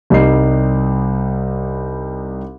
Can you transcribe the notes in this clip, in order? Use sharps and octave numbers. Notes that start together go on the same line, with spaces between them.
C2 G3 D#4 C7